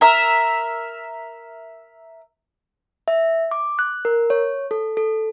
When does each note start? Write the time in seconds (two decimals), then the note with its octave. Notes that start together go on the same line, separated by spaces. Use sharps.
0.01 A#4 E5
3.08 E5
3.51 D6
3.79 F#6
4.05 A#4
4.30 C#5
4.71 A4
4.97 A4